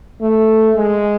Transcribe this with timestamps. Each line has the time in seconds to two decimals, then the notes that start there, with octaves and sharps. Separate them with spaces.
0.21 A3
0.76 G#3